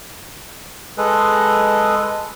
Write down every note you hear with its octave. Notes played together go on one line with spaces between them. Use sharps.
G#3 G#4 A4 B4